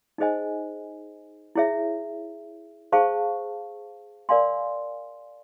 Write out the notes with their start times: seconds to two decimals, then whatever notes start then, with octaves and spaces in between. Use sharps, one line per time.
0.18 D#4 G#4 C5 D#5 G#5
1.55 E4 G#4 C#5 E5
2.92 G#4 C5 F5 A5 C#6
4.29 A#4 D5 F5 G#5 C6